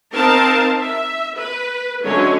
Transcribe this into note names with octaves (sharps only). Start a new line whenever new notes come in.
C4 D#4 A#4 F5 A5
E5
B4
D3 F#3 G#3 A3 C#4 C#5